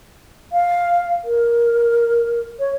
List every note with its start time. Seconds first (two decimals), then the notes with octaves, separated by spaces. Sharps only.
0.52 F5
1.24 A#4
2.60 C#5